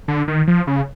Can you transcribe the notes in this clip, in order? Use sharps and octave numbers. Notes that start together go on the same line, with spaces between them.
D3
D#3
F3
C#3